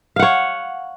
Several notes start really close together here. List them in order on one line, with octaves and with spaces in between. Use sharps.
F5 F#5 C#5